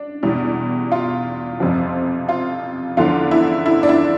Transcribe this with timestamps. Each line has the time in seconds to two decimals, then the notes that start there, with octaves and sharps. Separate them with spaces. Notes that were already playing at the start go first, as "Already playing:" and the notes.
Already playing: D4
0.23 E2 B2 G3
0.92 F4
1.60 F2 C3 F3
2.29 F4
2.97 E2 D3 F3 F4
3.31 E4
3.66 E4
3.83 D4
3.89 E4